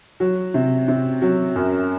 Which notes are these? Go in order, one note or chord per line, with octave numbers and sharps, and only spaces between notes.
F#3
C3
C3
F#3
F#2